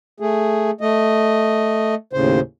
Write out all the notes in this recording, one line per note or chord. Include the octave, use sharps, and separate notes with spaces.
A3 G#4
A3 D#5
D#2 A2 C#3 C5